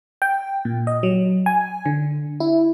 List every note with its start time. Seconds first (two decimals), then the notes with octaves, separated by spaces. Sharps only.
0.22 G5
0.65 A#2
0.87 D#5
1.03 F#3
1.46 G#5
1.86 D3
2.40 E4